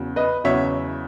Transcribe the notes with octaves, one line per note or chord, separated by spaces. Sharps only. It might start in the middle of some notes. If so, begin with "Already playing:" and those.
Already playing: E2 C#3 F#3
B4 D#5
E2 C#3 F#3 C#5 E5